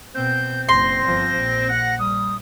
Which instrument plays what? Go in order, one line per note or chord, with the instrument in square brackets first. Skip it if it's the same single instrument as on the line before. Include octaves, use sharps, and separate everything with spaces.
[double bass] B2 [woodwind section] C4 C5 [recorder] G6
[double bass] F#1 [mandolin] C6 [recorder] A#6
[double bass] G1 F3
A#1
[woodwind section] F#5
[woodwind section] G3 [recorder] D#6